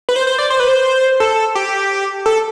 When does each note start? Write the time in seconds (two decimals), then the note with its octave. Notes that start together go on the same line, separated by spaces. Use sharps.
0.09 B4
0.16 C5
0.27 C5
0.38 D5
0.50 C5
0.60 B4
0.68 C5
1.20 A4
1.55 G4
2.26 A4